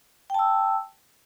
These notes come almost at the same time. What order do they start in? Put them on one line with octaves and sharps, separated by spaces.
G5 A5 E6